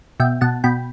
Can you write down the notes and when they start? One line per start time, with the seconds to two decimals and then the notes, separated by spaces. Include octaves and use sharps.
0.20 B2 E5 G5
0.41 B2 F#5 A5
0.64 B2 G5 B5